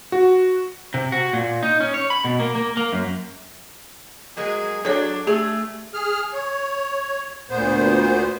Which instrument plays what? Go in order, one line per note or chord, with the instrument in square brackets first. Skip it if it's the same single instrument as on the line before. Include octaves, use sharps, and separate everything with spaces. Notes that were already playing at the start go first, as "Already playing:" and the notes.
[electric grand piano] F#4
[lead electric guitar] C3
F#4
A#2
D#4
C#4
C#5
B5
B2
A#3
A#3
A#3
F#2
[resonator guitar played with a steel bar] F#3 G#3 A#3 [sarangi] G#4
[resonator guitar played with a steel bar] F#3 G#4 [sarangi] D4 [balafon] A4 C#5
[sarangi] A3 [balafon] G4 [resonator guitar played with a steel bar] G#4
[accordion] G#4 F6
C#5
D2 A#2 B3 C5